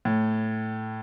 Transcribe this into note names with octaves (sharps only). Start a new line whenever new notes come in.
A2